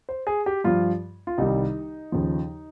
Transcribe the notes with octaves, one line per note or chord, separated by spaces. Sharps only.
C5
G#4
G4
G2 F3 F4
F4
C2 C3 D#3 G3 D#4
D#2 C#3 F3